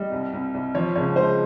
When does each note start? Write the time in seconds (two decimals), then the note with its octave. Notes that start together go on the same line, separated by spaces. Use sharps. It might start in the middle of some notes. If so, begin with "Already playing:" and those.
Already playing: G3 D#5
0.12 C2
0.33 C2
0.54 C2
0.75 F3 C#5
0.96 C#2 C#5
1.16 G#3 C5